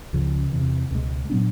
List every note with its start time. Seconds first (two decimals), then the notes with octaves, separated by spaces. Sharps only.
0.13 C#2 C#3 F3
0.52 E2 C3 E3
0.91 C#2 B2 G#3
1.30 A#2 F#3 B3 D4